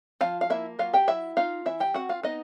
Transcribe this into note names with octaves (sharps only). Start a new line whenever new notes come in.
F3 F4 F5
F5
A#3 E4 E5
F#3 F4 F5
G4 G5
F#3 E4 E5
D#4 F4 F5
E3 E4 E5
G4 G5
C4 F#4 F#5
F4 F5
B3 D#4 D#5